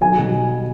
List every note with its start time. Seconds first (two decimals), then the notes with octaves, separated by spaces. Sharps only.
0.01 B1 G#5
0.18 B2 G3